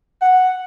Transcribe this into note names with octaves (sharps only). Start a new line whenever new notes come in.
F#5